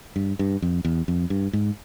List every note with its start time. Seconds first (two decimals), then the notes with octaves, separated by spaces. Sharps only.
0.16 G2
0.39 G2
0.62 F2
0.85 E2
1.08 F2
1.30 G2
1.53 G#2